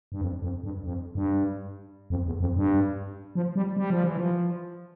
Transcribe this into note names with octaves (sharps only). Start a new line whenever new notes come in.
G2
F2
F2
G2
F2
G2
F2
E2
F2
G2
F3
G3
G3
F3
E3
F3